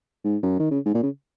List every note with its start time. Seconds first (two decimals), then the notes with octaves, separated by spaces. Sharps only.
0.25 G#2
0.43 F#2
0.60 D#3
0.71 C#3
0.86 G#2
0.95 A#2
1.03 C#3